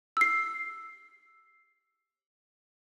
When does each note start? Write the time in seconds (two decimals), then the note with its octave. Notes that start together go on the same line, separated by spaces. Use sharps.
0.17 E6 C7